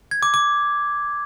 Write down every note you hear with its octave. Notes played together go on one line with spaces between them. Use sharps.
G#6
D6
D6